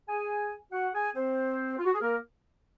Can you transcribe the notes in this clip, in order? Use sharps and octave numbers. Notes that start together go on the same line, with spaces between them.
G#4 G#5
F#4 F#5
G#4 G#5
C4 C5
F4
F#4
G#4
A#3 A#4